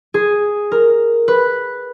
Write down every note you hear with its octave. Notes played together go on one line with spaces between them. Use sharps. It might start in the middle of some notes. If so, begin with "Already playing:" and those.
G#4
A#4
B4